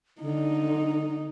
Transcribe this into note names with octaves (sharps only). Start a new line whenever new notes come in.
D3 D#4